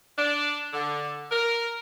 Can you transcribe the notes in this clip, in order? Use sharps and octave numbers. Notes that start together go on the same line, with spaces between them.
D4
D3
A#4